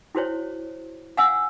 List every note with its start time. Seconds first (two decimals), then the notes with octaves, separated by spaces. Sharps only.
0.15 E4 F#4 C5 C#5
1.17 F5 F#5 G#5 E6